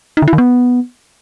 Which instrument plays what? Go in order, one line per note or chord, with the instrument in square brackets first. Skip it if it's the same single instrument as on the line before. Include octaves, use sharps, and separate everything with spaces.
[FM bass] D#4
D3
E4
D#3
B3